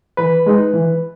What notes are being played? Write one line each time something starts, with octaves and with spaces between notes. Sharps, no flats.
E3 B4
G#3 D#4
E3